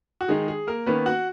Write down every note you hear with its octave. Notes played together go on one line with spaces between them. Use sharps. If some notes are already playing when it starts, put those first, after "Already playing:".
F#4
D#3 G#3 D#4 G#4
G#4
A#3 A#4
D#3 A#3 B3 C#4 B4
F#4 F#5